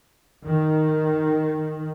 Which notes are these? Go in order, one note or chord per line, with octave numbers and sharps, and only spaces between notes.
D#3